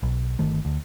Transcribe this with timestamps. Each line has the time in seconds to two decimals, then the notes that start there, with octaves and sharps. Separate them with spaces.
0.03 B1
0.39 G1 D#3 A3
0.65 D2